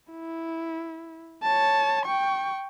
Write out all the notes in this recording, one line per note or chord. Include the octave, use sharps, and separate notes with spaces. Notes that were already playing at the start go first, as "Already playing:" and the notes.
E4
C#5 A5
G5 C#6